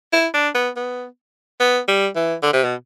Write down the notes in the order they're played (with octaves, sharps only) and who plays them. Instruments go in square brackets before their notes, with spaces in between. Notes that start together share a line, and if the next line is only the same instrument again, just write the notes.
[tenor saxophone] E4
D4
B3
B3
B3
G3
E3
D3
C3
B2